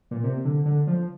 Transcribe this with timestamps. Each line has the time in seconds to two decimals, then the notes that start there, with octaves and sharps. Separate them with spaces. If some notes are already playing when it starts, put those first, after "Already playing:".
0.11 A#2
0.24 C3
0.45 D3
0.66 D3
0.87 F3